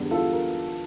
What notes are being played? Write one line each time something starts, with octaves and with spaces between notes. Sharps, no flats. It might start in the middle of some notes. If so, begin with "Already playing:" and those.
Already playing: E2 D3 G3
F4 A4
A#4